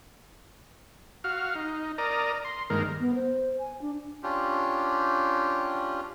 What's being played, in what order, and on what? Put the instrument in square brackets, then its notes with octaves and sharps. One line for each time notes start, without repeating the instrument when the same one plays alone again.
[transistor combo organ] F#4 F5 F6
D#4
A#4 D5 A#5 D#6
C6
G2 D#3 G#3 A#3 A#4
[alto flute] B3
C5
G#5
D4
[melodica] C#4 D4 F4 G4